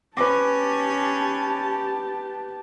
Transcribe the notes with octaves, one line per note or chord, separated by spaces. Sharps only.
C#4 G4 B4 A5 D6